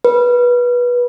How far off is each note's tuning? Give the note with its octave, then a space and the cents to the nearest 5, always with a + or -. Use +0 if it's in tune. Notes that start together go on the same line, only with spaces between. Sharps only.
B4 -20